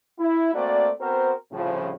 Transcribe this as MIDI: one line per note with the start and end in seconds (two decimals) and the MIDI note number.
0.19 0.51 64
0.53 0.88 57
0.53 0.88 58
0.53 0.88 60
0.53 0.88 66
0.53 0.88 72
0.53 0.88 74
1.00 1.31 59
1.00 1.31 60
1.00 1.31 66
1.00 1.31 70
1.00 1.31 72
1.51 1.92 36
1.51 1.92 45
1.51 1.92 49
1.51 1.92 53